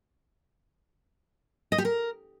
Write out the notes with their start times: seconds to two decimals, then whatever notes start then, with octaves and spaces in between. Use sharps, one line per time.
1.72 D#5
1.78 G4
1.85 A#4